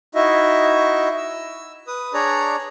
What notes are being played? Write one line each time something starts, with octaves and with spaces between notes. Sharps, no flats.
D#4 E4 F#4 D#5 E5
E6
B4 D#6
D4 G#4 C#5 D5 A#5